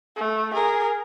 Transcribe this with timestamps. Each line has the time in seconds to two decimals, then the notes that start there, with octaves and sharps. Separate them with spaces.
0.16 A3
0.54 G#4 A#4